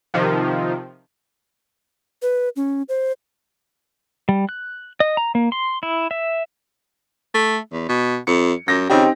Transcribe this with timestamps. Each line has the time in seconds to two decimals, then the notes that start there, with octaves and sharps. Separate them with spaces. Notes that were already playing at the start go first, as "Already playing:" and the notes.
0.14 C3 D#3 F3
2.22 B4
2.56 C#4
2.89 C5
4.29 G3
4.49 F#6
5.00 D#5
5.17 A#5
5.35 A#3
5.52 C6
5.83 E4
6.11 E5
7.34 A3
7.72 E2
7.89 B2
8.27 F2 C#7
8.68 F#2 A#6
8.90 C#3 C4 D#4 G4